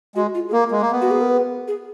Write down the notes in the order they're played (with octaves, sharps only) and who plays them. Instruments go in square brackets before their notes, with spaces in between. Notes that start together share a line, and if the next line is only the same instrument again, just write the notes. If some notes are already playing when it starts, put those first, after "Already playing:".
[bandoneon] G#3 [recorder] F#4
[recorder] F4
G#4
[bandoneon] A#3 [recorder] A#4
[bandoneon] G#3
A#3
B3
[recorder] F#4
G#4
A#4
B4
G#4